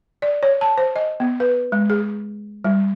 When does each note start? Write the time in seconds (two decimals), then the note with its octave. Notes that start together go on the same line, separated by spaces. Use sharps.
0.22 D5
0.43 C#5
0.61 A5
0.78 C5
0.96 D#5
1.20 B3
1.40 B4
1.72 G#3
1.90 G#4
2.64 G3